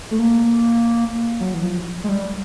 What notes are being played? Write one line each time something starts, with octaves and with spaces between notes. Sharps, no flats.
A3
A#3
F#3
E3
F3
G#3
G3